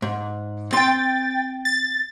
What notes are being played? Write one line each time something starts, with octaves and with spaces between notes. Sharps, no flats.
G#2
C4 G5 C6 A6
A6